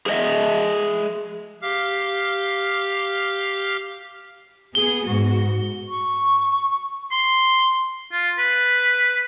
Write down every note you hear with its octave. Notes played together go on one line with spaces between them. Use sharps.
G#4 A#4 C5 D#5 E5
G4 F5 F6
B3 G#4 G7
G#2 F#4
C#6
C6
F4
B4